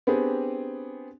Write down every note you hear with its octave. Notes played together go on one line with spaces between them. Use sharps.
B3 C4 D4 G4 G#4